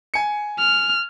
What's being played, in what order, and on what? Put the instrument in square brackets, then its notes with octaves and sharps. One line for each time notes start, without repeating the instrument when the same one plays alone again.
[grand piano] G#5 C#7
[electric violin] F6